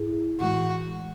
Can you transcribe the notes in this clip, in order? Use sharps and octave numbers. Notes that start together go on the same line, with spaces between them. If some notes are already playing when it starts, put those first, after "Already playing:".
Already playing: G#2 E4 G#4
A2 E3 G#3 F#4